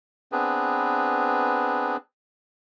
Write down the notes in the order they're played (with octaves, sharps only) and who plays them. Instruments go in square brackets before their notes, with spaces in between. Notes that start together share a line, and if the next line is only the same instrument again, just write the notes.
[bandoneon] B3 C4 D4 G#4 B4